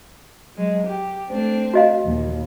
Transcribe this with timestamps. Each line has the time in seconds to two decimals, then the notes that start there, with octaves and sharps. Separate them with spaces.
0.56 F#3 G#3
0.85 G4
1.29 A3 C4 D4
1.73 F#4 D#5 F5
2.05 D#2 A#2